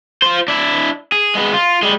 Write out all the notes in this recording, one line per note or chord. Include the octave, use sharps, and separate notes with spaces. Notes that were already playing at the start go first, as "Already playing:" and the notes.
F4 C5
D4 E4
G#4
G#3 B3
F4
G3 G#3